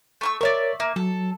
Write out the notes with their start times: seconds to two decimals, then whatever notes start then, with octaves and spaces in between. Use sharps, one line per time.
0.21 A3 C#6 E6
0.41 A#4 C#5 D5 E5 C#6
0.80 A#3 E5
0.96 F#3 A4